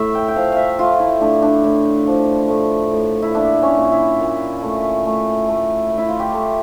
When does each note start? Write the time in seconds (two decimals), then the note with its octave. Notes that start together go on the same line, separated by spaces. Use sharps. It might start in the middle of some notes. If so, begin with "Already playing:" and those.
Already playing: A2 E5
0.15 G5
0.28 G5
0.36 F3 F5
0.52 E5 F5
0.78 A3 F4
1.00 E4
1.20 A2 D4
1.42 D4
1.64 A2
2.07 F3
2.49 A2
2.92 A2
3.22 E4
3.35 A#2 D4
3.63 C#4
3.78 A#2
3.92 E4
4.20 A#2
4.62 A3
5.05 A3
5.48 A3
5.90 A3
5.98 E4
6.09 F4
6.20 G4
6.33 A3